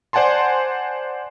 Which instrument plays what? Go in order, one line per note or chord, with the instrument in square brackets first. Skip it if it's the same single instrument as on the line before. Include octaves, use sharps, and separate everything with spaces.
[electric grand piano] C5 D5 F#5 G#5 A5 C6